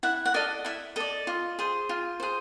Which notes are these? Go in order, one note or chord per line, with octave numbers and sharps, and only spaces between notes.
E4 E5 F#5
F#5
A4 D5 D#5 F5
E4 E5
A4 D5 D#5
F4
G#4 C5
F4
G#4 C5